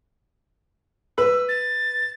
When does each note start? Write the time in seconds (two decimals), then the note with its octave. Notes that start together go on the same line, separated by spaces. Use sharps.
1.18 B4 E6
1.49 A6